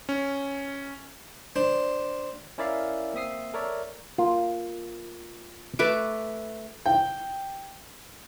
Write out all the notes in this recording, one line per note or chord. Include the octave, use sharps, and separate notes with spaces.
C#4
D4 C5
C#4 E4 A#4 D5 E5 F5
A#3 C4 E5 D#6 C7
A4 A#4 C#5 D5 E5
A#3 F4
A3 B4 D6
G5